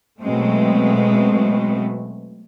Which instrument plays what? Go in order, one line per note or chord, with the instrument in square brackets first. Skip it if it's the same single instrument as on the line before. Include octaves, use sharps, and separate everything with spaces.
[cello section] B2 F#3 G#3 A3 C4